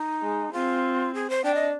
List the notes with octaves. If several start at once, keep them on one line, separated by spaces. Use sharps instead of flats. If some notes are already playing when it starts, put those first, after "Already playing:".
Already playing: D#4
G#3
C4 F4
G#4
C5
D4 G5
D#5